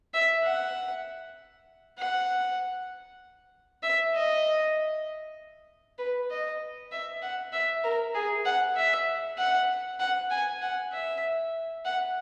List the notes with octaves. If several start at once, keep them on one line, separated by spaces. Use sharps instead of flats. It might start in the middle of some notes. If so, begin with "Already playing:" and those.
E5
F#5
F#5
E5
D#5
B4
D#5
E5
F#5
E5
A#4
G#4
F#5
E5
F#5
F#5
G#5
F#5
E5
F#5